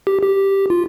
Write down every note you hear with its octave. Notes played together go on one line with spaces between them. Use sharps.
G4
G4
F4